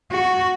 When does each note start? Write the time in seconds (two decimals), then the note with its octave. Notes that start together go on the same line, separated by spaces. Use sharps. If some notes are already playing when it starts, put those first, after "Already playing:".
0.12 F#4